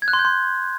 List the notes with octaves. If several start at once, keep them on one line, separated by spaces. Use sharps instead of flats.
G#6
F#6
C6
G6
C6